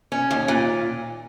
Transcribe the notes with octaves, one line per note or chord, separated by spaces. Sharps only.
C#4
D#2
A#2